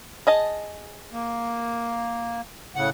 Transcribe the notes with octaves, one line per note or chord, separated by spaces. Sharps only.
G#4 D#5 A5
A#3
A2 C#3 F#5